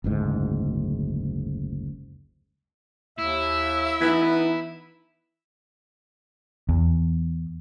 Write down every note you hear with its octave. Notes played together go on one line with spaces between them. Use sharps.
F#1 D2 G#2
D#2 E4 E5
E3 B3 D#4 B4
E2